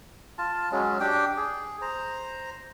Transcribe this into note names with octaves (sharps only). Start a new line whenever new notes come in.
F4 A5
F#3 G#3 C#4
D4 G4 G5
G#4
C5 A#5